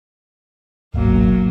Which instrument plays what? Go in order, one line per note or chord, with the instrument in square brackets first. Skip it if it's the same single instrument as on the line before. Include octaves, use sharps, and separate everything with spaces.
[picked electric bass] D1 G#1 B2 [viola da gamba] F#3 A#3